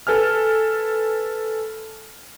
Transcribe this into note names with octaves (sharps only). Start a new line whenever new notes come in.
A4 B4 G#5 F6